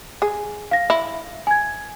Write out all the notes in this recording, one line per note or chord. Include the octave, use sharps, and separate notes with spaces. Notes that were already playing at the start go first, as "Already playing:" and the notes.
G#4
F5 A#6
E4
G#5 G#6